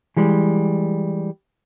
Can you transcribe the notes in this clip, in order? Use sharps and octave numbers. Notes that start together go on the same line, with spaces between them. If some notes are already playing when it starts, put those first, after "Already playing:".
E3 G3 G#3